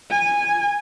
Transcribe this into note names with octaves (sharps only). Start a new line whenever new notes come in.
G#5